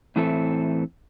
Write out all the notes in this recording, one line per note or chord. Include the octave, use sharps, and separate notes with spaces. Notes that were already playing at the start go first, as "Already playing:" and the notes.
A2 E3 C4 A4 E5